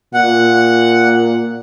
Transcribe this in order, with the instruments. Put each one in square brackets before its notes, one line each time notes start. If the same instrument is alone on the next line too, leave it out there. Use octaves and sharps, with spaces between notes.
[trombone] A#2 [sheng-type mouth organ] F#5